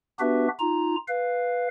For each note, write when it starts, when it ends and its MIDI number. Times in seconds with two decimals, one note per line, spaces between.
0.20 0.48 59
0.20 0.48 62
0.20 0.48 66
0.20 0.48 67
0.20 0.48 71
0.20 0.48 76
0.60 0.96 63
0.60 0.96 65
0.60 0.96 82
1.08 1.68 71
1.08 1.68 77